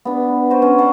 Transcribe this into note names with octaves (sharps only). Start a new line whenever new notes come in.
B3 D4
F#4 B4 C5 D5
C#4
D5 F#5 A5 C6